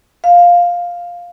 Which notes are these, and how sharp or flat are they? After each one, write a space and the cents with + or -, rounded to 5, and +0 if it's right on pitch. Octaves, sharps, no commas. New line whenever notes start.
F5 +5